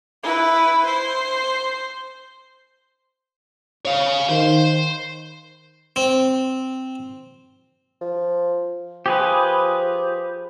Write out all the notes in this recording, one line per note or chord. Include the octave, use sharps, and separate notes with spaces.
E4 B4
C5
C#5 F5
D#3 C5
C4
F3
F3 G4 G#4 B4